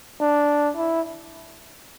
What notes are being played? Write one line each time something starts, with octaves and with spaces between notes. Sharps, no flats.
D4
E4